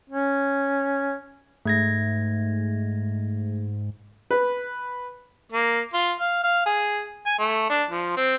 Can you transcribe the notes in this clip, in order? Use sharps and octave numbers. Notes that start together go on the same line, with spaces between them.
C#4
G#2 A3 G#6 A#6
B4
A#3
F4
F5
F5
G#4
G#5
A3
D4
F3
C4